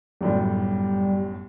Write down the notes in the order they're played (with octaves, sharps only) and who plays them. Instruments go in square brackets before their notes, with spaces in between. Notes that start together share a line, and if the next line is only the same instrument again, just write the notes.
[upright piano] G1 F#2 A2 [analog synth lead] G3